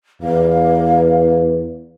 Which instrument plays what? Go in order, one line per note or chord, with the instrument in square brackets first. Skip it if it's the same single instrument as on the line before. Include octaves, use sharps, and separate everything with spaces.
[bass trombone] E2 [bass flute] B4 [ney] F5